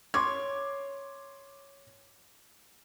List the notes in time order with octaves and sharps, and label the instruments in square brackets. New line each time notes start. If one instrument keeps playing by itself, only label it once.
[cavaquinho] C#5 [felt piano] C6 D6 G#6